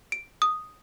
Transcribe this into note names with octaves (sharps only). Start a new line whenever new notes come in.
D7
D#6